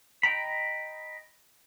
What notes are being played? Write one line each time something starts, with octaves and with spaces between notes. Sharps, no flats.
D#5 G5 A#5 B5